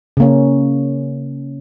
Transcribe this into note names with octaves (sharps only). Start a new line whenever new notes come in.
C#3 A#3 C#4